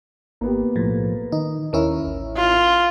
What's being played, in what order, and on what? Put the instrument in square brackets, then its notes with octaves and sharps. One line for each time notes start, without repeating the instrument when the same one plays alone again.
[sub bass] G#1 [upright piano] A#3 B3 G4
[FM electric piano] B1 A2 [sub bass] F3
[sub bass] D#3 [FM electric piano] D#4
[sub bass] D#2 [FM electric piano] D#3 C#4 E4 [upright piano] A#4
[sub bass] A1
[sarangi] F4